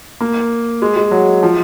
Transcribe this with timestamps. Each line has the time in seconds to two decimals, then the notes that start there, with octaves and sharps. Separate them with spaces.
0.20 A#3
0.82 G#3
0.96 G#3
1.11 F#3
1.43 F3